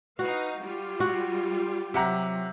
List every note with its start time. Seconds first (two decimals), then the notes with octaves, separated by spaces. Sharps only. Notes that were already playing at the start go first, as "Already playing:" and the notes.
0.19 D#4 F#4 B4 F5
0.62 G3 F4 G4
1.00 F#4
1.94 C3 F#3 G4 F#5 A#5